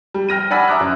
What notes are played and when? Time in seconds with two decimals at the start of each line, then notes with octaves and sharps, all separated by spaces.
0.14 G3
0.29 G5 F6 A#6 D#7
0.51 D5 F#5 G#5 B5 E6 B6
0.68 E5 A#5 D6 D#6 F#6
0.80 F#2